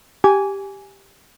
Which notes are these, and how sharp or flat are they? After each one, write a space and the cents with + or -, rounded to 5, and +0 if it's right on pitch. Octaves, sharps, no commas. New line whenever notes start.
G4 +0 G#5 +0 D6 -30